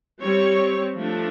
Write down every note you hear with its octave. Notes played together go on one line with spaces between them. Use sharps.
G3 C4 C#5
F3 A3 D4